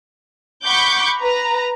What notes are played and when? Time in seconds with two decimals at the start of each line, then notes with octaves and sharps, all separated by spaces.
0.63 F#5 B5 C#6 D6 G6
1.20 B4 A#5